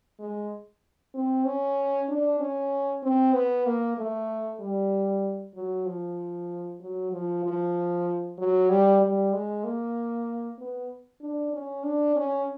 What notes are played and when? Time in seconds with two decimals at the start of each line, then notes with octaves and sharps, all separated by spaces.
0.19 G#3
1.15 C4
1.45 C#4
2.09 D4
2.40 C#4
3.03 C4
3.35 B3
3.66 A#3
3.98 A3
4.60 G3
5.55 F#3
5.86 F3
6.80 F#3
7.12 F3
7.44 F3
8.38 F#3
8.69 G3
9.01 G3
9.33 G#3
9.64 A#3
10.58 B3
11.21 D4
11.53 C#4
11.84 D4
12.16 C#4